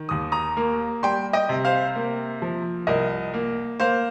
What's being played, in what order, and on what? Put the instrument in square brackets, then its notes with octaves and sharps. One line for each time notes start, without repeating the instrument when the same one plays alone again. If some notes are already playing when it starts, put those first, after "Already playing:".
Already playing: [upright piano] D#3
D#2 D#6
A#5 D#6
A#3
G3 G5 C6
D#5 G5
C3
C5 F5
A#3
F3
C2 A#4 D#5
A#3
A#3 C5 F5